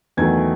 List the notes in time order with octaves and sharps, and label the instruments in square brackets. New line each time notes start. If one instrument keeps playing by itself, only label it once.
[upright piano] E2 D#3 F#3 A3 G#5 G#6